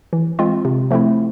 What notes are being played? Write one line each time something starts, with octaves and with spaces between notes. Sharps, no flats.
E3
G#3 C4 F4
C3
F3 A3 C4 E4